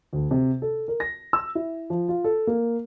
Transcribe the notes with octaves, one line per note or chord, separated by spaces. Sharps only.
D2
C3
A4
A#4
A#6
E6
E4
F3
F4
A4
A#3